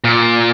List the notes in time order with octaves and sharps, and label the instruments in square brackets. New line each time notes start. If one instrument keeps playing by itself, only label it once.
[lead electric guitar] A#2